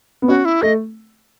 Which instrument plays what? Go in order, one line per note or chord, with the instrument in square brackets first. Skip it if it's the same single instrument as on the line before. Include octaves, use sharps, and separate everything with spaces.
[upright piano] B3
[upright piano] C#4 [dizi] F#4
[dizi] E4
[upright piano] A3 [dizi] D#5